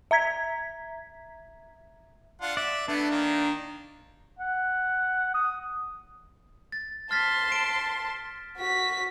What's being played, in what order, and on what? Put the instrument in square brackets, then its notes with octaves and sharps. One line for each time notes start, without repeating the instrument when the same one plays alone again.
[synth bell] E5 A#5 G#6 B6
[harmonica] D4 F4 F#5
[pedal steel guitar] D5 [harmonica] E5
[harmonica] A3 B3 E4 [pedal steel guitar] D4
[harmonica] D#3 A#3
[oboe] F#5
D#6
[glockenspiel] A6
[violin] A5 C6 [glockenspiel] F6 A6 B6
[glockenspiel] D7 E7
[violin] F#4 B6